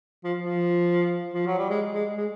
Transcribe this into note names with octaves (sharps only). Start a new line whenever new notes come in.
F3
F3
F3
F#3
G3
G#3
G#3
G#3